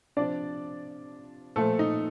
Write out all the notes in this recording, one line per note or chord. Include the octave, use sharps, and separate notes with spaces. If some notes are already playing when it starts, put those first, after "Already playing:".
C3 F3 D4 D5
A#2 F3 A3 A4
D#4